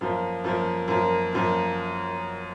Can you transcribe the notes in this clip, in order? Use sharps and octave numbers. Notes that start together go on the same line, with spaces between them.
F#2 F3 A#3
F#2 F3 A#3
F#2 F3 A#3
F#2 F3 A#3